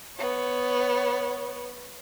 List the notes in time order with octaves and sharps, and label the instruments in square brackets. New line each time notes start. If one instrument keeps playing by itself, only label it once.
[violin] B3 C#5